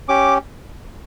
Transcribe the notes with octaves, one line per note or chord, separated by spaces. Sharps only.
C#4 G4 D6